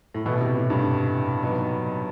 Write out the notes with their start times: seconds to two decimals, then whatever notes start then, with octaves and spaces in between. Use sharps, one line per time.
0.14 A2
0.25 B2 E3 B3 E4 A4
0.36 B2
0.41 C3
0.55 A2
0.70 G2
1.42 F#3 B3 D#4